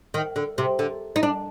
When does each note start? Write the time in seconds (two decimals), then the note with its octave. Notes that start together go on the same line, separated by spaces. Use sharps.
0.14 D#3
0.36 D3
0.58 C3
0.79 D3
1.16 D#4
1.23 D4